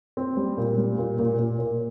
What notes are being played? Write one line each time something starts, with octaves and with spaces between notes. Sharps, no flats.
C4
G3
A#2
G3
A#2
A#2
A#2
A#2